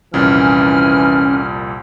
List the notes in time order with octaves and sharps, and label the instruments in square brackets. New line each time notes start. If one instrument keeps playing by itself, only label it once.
[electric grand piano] C2 F2 A#2 [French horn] E3 [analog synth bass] C#4 [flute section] G#5 F6